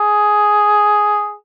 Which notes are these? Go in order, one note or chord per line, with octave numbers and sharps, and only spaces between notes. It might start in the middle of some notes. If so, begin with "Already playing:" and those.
Already playing: G#4